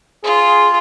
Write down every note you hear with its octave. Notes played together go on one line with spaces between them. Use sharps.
F4 G#4